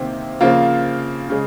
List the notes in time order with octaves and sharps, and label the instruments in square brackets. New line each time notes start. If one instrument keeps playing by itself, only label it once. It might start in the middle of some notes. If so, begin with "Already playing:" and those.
Already playing: [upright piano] C3 D#3 A#3 [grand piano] C4
[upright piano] C#3 F3 A#3 F4
C#3 G#3